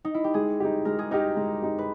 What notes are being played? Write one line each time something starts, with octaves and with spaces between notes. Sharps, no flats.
D#4
E4
G4
G#3 G#4
D#4 G4
G#3 A#4
G#4
D#4 G4 A#4
G#3
D#4 G4
B4